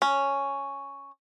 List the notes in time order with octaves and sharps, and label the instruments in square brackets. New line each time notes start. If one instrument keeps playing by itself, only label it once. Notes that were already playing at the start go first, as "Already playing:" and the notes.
[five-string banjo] C#4